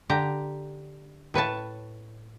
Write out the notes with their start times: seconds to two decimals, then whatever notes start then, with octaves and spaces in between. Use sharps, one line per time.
0.09 D3 G4 A#5
1.34 A2 B4 C#5 A5